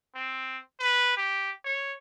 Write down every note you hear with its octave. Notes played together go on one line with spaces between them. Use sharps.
C4
B4
G4
C#5